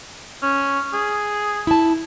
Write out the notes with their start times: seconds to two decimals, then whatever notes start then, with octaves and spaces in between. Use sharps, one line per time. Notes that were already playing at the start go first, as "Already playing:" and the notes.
0.43 C#4
0.93 G#4
1.67 E4 A5